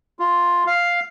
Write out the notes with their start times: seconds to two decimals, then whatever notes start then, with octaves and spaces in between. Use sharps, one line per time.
0.19 F4
0.67 F5